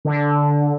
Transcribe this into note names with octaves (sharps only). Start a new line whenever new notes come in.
D3